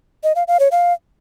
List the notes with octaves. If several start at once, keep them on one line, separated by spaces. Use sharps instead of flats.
D#5
F5
F5
C#5
F5